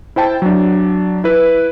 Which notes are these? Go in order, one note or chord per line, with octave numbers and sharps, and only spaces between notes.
E4 C5 G5 A5
F#3 D4
E4 B4